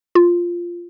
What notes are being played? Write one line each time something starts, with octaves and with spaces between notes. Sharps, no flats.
F4